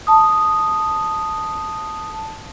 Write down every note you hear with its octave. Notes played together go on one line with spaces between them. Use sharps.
A5 D#6